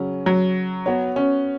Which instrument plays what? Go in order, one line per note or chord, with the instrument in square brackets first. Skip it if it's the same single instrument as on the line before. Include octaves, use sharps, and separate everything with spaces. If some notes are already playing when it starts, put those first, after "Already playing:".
Already playing: [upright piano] C#3 F#3 C#4
[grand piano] F#3
[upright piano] B3 F#4 C#5
[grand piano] C#4